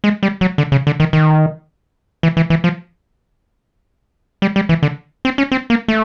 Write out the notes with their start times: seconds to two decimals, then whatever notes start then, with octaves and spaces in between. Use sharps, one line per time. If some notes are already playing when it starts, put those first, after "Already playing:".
0.04 G#3
0.23 G3
0.41 F#3
0.58 D3
0.72 C#3
0.87 D3
1.00 D#3
1.13 D#3
2.23 E3
2.37 E3
2.50 E3
2.64 F3
4.42 G3
4.56 G3
4.69 E3
4.83 D3
5.25 C4
5.38 C#4
5.52 C4
5.70 A#3
5.88 A3